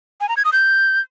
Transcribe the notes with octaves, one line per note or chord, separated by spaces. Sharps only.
G#5
A#5
G#6
D#6
G6